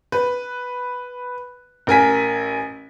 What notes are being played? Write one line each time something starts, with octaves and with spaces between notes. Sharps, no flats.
B4
A1 A#4 G#5 B6